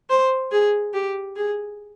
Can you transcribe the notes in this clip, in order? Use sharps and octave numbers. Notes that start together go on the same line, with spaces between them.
C5
G#4
G4
G#4